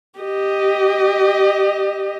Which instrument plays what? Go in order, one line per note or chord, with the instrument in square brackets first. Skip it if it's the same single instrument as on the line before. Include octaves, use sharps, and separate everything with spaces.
[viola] G4 D#5